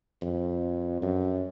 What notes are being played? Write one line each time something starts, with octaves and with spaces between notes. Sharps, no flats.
F2
F#2